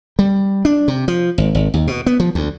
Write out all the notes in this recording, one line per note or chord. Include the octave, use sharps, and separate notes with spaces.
G3
D4
C3
F3
G#1
G#1
D#2
B2
B3
F3
D2